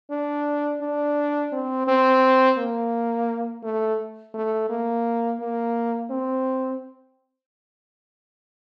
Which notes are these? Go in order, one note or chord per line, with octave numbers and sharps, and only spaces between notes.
D4
D4
C4
C4
A#3
A3
A3
A#3
A#3
C4